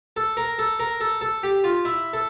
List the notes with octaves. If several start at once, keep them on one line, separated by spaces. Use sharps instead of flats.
A4
A#4
A4
A#4
A4
A4
G4
F4
E4
A4